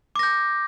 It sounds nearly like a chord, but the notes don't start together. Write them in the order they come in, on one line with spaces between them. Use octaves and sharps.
D6 A#6 G6